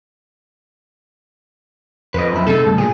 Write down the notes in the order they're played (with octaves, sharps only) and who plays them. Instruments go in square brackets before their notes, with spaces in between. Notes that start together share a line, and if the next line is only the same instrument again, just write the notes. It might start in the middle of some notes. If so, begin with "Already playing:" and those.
[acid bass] F2 [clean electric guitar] B4 D#5
[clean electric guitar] F#2 E4
[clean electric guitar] C3 G#3 D#4 [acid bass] A4
[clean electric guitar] D2 G2
[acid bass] A#2 [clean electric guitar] G#4